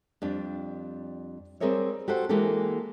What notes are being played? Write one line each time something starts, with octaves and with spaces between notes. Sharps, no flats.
F2 G3 D4
G3 C4 G#4 A#4 C#5 E5
F#4 G4 A4 C5 F#5
E3 G#3 A#3 F#4 G4 A4